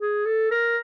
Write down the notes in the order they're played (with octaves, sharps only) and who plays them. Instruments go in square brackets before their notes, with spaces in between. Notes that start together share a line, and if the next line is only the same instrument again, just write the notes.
[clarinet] G#4
A4
A#4